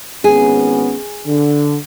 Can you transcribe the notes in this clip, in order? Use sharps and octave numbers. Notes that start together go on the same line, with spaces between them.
G#1 B3 C#4 G#4
D3